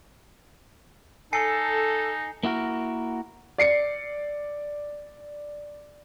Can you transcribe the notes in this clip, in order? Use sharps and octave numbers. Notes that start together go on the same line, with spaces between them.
D#4 A4 G#5 C7 C#7
A#3 E4 F#4 A#4
D5 C7 C#7